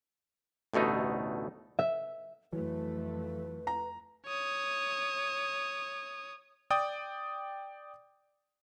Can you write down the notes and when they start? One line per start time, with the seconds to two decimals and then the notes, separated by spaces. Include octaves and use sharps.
0.74 A1 D2 B2 A3 D#4
1.79 E5
2.53 F2 E3 F#3 A3 B4
3.67 A#5
4.27 C#5 D#6
6.70 D5 G5 D#6